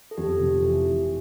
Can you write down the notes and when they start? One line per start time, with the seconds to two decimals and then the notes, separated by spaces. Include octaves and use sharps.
0.11 A4
0.17 F2 G4
0.40 F1
0.63 E3
0.86 E3